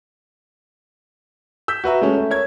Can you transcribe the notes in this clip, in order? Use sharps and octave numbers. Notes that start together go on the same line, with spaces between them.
E6 G6 B6
F#4 B4 E5 A#5
G#3 A3 C#4
A3
A#4 C#5 G#6